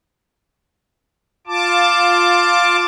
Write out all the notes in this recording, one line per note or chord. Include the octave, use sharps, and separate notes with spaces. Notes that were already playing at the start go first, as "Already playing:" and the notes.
F4 A5 D6